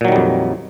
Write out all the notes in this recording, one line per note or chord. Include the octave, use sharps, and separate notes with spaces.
F2 A#2 D#3 F#3 G3